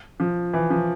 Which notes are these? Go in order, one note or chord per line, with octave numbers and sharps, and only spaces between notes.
F3
E3
F3